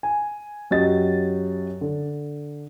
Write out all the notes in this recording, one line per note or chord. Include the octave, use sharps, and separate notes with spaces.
G#5
F#2 F#3 G4 D#5 A6
D3